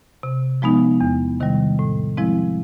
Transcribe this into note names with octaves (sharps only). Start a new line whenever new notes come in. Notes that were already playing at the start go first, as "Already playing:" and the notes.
C3
F3 G#3 B3 D#4
E2
C3 D#3 G3
A2
F3 G#3 C4 E4